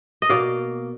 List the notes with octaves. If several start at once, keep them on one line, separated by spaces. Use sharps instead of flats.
D#5
B2 A#3 D5 F5